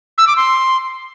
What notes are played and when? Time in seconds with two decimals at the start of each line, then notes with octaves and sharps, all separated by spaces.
0.18 E6
0.27 D6
0.37 C6